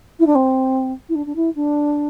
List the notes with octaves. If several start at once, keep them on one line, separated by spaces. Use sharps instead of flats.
E4
D4
C4
E4
D4
D4
E4
D4